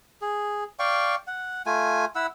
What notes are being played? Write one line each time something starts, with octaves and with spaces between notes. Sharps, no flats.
G#4
D5 F5 G5 C#6
F#5
A3 F4 G#5
E4 F#5 E6